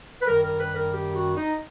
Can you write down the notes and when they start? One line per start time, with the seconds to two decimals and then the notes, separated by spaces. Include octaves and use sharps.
0.22 B4
0.26 F#2 D#3 G3 A#4
0.43 A#4
0.60 B4
0.76 A#4
0.93 G4
1.14 F#4
1.35 D#4